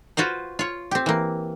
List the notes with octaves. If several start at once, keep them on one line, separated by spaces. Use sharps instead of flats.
F4 F#4 B4 C5
F4 C#5
C4 G4
E3 A#3